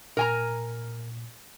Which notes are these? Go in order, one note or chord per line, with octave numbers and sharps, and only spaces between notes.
A#2 A#4 G#5 A#5